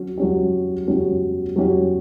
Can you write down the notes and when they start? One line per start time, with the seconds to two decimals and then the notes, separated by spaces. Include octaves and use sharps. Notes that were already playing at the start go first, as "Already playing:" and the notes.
Already playing: F#3 C#4
0.18 F#3 C#4 G4
0.88 F#3 C#4 G4
1.56 F#3 C#4 G4